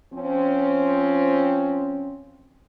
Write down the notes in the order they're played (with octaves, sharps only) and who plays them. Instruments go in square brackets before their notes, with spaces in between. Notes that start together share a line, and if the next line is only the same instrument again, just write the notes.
[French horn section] F3 C4 C#4